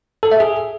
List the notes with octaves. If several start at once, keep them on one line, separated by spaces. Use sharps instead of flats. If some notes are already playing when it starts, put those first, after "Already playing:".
A4
E5
G#4